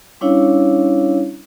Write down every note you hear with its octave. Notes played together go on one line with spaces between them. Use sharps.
G3 C#4 D4 E4 C#5 F5